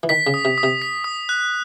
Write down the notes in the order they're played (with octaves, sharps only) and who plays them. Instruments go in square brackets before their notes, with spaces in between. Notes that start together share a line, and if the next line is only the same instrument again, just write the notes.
[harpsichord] E3
[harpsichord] D#3 [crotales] B6
[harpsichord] C#3
[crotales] D#6
[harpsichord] C3
[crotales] D#6
[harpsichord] C3
[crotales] B6
D#6
F#6